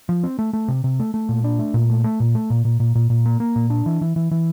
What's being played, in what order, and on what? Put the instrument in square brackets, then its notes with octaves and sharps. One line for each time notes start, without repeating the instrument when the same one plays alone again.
[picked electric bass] F3
C4
A3
A3
C3
C3
A3
A3
A#2
D4
A3
A#2
A3
A3
A#2
A3
A#2
A#2
A#2
A#2
A#2
A#3
A#3
A#2
D4
E3
E3
E3
E3